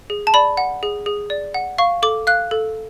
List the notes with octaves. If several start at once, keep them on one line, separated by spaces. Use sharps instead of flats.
G#4
A5
D5 B5
F#5
G#4
G#4
D5
F#5
F5 C#6
A4 D6
F5 F#6
A4